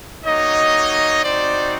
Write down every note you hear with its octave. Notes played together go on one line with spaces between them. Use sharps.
A#3 D#4 F#4 C#5 D#5
C4 D#4 F#4 C5 D5